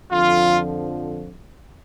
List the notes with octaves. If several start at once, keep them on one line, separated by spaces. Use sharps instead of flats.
F2 D3 F3 F4